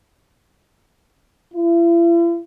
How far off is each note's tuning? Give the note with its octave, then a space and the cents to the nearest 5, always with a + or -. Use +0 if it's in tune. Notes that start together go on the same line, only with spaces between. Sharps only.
E4 +45